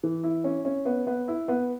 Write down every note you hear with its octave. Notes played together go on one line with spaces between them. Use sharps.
E3
E4
C#4
C#4
B3
B3
E4
B3